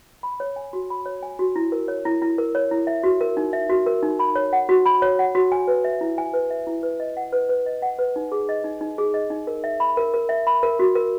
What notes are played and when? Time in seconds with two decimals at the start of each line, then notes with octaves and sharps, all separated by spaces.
0.23 B5
0.40 C#5
0.56 G#5
0.73 F#4
0.90 B5
1.06 C#5
1.23 G#5
1.39 F#4
1.56 E4
1.72 A#4
1.88 C#5
2.05 E4
2.22 E4
2.38 A#4
2.55 C#5
2.71 E4
2.87 E5
3.03 F#4
3.21 A#4
3.37 D#4
3.53 E5
3.70 F#4
3.86 A#4
4.02 D#4
4.19 B5
4.35 C#5
4.53 F#5
4.69 F#4
4.86 B5
5.02 C#5
5.19 F#5
5.35 F#4
5.52 G#5
5.67 B4
5.84 E5
6.01 E4
6.18 G#5
6.33 B4
6.50 E5
6.67 E4
6.83 B4
7.00 D#5
7.17 F#5
7.33 B4
7.49 B4
7.66 D#5
7.82 F#5
7.99 B4
8.16 D#4
8.32 G#4
8.49 D#5
8.64 D#4
8.81 D#4
8.98 G#4
9.14 D#5
9.30 D#4
9.47 A#4
9.64 E5
9.80 B5
9.97 A#4
10.14 A#4
10.29 E5
10.47 B5
10.63 A#4
10.79 F#4
10.95 A#4